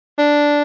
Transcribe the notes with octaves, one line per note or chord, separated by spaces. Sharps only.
D4